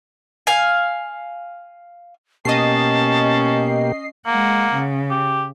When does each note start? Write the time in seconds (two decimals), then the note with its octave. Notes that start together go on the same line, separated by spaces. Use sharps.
0.47 F5 G#5
2.45 B2 A#3 C#4 G4 D#5 A5 C7
4.27 G#3 A#3 F#5
4.74 C#3
5.10 G4